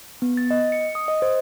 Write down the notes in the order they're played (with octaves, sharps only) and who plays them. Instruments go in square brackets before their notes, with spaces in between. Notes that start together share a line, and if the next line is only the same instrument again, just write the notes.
[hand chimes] B3
A6
D#5
C#7
D#6
D#5
C5